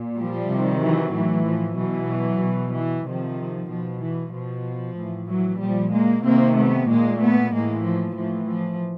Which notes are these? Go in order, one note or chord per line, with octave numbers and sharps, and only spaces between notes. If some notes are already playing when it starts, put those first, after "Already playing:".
Already playing: A#2
F3 G3
C3 D#3
E3 F#3
A2 E3
F3
B2 E3 F#3
B2
E3
C3 D#3 F3
B2 F3
E3
B2 F3
A2 E3
E3 F#3
A#2 F3 G3
G#3 A#3
C3 D#3 A#3 C4
A3 B3
A#2 G#3 A#3
A3 B3
A2 E3 G#3 A#3
F3
A2 E3 F3
F3